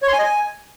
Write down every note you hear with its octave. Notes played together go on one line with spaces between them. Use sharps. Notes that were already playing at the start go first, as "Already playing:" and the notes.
C#5
C6
G#5
D#5
G#5